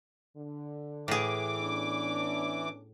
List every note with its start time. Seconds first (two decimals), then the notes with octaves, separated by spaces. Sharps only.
0.36 D3
1.08 A2 E3 G#4 D6
1.60 B3 C#4 D4